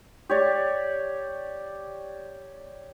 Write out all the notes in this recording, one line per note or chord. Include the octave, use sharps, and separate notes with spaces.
G4 C#5 D5